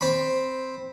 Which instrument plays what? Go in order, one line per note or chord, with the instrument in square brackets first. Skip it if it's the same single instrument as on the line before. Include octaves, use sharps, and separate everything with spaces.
[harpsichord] C4 B5